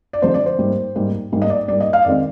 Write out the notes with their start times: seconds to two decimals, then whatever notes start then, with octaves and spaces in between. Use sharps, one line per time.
0.13 D5
0.22 D3 F3 G#3 C4 C5
0.34 D5
0.46 C5
0.59 G#2 G3 A#3
0.95 G#2 G3 A#3
1.32 G#2 G3 A#3
1.42 D#5
1.50 D5
1.68 G#2 G3 A#3 D5
1.80 D#5
1.93 F5
2.05 F2 D#3 G#3 C4 D5